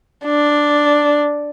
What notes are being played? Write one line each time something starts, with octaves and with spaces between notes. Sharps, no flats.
D4